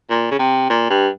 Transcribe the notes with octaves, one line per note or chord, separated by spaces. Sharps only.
A#2
C#3
C3
A#2
G2